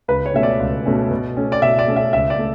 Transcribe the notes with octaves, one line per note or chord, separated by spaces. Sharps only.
C#2 B4
C#5
B2 A3 C#4 E5
D5
C#2
B2 A3 C#4
B2
A3 C#4
D5
B2 E5
D5
A3 C#4
E5
C#2 E5
D5
A3